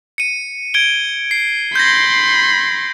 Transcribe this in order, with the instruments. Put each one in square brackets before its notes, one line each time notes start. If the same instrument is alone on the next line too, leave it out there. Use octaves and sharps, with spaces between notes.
[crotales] C#7 D#7
G#6 D7 G7
C7
[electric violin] B5 C6 [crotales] G6 G#6 A#6